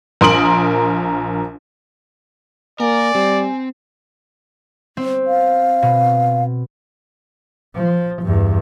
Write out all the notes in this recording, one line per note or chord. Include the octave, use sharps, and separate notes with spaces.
A#1 A#4 C6 D#6 D7 F#7
A#3 A#4 D5 G#5
G3 C4
C4
F5
B2
F3
E2 G2